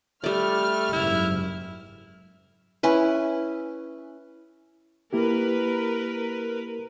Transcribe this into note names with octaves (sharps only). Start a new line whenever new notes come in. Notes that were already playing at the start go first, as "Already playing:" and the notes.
G3 A3 D5 F6
F#1 G#2 E4
C#4 E4 B4
A#3 E4 G4 A#4 B4